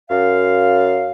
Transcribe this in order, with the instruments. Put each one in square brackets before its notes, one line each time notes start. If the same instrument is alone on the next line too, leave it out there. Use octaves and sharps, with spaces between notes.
[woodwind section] F#2 F5